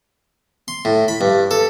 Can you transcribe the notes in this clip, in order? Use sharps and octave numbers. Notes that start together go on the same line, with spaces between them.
C6
A2
B5
G2
A4